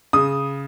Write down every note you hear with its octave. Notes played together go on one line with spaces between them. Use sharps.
C#3 D#6